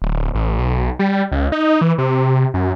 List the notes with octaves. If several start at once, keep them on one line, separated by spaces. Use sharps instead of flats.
D1
A1
B1
G3
C#2
D#4
E3
C3
F#2